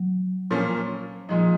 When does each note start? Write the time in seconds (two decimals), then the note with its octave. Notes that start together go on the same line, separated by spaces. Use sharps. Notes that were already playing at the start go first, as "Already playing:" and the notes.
Already playing: F#3
0.51 A#2 F3 A#3 C#4
1.29 A#2 F3 G#3 D#4